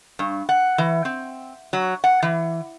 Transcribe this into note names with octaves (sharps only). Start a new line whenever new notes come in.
G2
F#5
E3
C4
F#3
F#5
E3